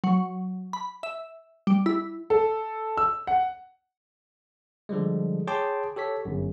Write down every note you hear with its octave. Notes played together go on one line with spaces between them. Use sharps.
F#3
B5
E5
G3
E4
A4
E6
F#5
D3 F3 G3 G#3
G#4 C#5 G5 A5 C6 D6
G4 A4 C#5 B6
G1 F#2